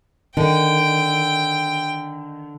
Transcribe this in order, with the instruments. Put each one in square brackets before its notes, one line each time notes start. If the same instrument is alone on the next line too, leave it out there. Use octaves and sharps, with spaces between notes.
[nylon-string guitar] D3 [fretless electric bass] D#3 [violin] G5